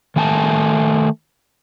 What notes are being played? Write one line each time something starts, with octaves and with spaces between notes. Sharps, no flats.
D#3 A3 G#5 A5